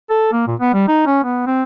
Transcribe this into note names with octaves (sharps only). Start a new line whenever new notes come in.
A4
A#3
A#2
B3
G3
D#4
C#4
B3
C4